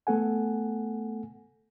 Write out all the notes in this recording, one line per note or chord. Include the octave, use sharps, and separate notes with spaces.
A3 B3 A4 F#5 G#5